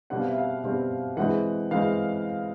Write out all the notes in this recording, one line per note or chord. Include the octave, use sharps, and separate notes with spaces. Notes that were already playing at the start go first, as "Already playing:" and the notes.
B2 G3 C4 F#5
F5
E5
F5
B2 G3 C4
E3 G#3 C4 F#5
E3 G#3 C4 F5